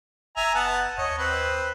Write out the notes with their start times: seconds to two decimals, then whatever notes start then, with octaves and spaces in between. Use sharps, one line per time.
0.37 F#1 E5 G#5 A#5
0.55 B3 F#5 A5
0.98 D#2 C#5 D#5
1.18 C4 B4